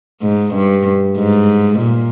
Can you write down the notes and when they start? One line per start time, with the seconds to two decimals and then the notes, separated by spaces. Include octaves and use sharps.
0.22 G#2
0.54 G2
1.17 G#2
1.79 A#2